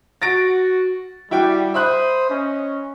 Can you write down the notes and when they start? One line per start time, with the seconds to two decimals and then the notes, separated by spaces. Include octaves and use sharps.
0.22 F#4 A6 A#6 D7
1.31 G3 E4 F#4 G5
1.74 C5 E5 B5 D#6 F#6
2.29 C#4 D#5